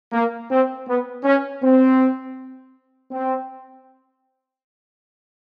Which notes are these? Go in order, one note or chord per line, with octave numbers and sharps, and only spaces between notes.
A#3
C4
B3
C#4
C4
C4